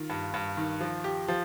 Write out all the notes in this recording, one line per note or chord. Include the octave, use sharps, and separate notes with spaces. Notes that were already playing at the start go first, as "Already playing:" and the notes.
Already playing: D#3 F4
G2
G2
D#3
F3
G4
F3